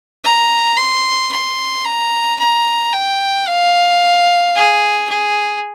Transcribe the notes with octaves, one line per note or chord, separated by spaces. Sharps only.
A#5
C6
C6
A#5
A#5
G5
F5
G#4
G#4